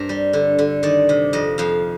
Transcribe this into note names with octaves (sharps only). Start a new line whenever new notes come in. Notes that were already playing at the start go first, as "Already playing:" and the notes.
Already playing: G2 C4 G4 A#4
G3
D3
D3
D#3 D5
C3
F2 D#5
F2 F5